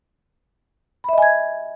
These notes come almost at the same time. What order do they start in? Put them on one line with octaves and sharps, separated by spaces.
B5 E5 D#5 G#5 G#6